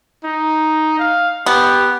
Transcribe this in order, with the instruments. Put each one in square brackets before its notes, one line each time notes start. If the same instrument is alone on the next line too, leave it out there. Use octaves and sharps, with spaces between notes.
[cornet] D#4
F5
[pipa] B3 [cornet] G4